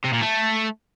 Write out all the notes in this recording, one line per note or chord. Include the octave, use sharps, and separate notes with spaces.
C3
A#2
A3